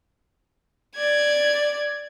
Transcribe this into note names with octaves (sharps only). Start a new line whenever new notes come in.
D5 G#6